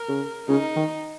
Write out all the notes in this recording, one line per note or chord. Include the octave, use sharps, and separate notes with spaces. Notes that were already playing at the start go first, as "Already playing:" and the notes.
Already playing: A#4
C#3
C#3 D#4
D#3